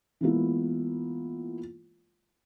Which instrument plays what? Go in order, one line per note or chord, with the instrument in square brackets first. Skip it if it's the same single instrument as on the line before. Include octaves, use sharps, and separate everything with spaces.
[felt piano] E3 G#3 A#3 B3 E4 F4